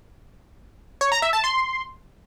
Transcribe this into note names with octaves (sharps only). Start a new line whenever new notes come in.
C#5
A#5
E5
A5
C6